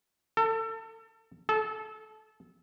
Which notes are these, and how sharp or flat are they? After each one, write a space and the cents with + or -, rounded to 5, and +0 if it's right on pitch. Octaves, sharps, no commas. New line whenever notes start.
A4 +30
A4 -25